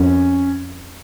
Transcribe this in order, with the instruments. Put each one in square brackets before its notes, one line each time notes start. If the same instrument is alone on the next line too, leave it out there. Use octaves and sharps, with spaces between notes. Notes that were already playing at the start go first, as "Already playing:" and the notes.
Already playing: [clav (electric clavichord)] F2 [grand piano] C#4